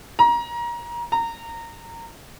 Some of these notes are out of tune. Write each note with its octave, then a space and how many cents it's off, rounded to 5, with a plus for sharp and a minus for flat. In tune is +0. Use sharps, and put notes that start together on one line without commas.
A#5 +25
A#5 -20